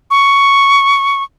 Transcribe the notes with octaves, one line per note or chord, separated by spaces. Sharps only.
C#6